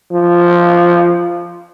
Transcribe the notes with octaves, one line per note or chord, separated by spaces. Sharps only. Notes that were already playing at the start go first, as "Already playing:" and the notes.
F3